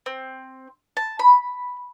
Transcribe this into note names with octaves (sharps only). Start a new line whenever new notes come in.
C4
A5
B5